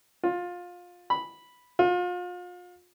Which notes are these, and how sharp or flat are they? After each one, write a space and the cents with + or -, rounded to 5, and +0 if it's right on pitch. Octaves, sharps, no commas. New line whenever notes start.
F4 +20
B5 -5
F4 +35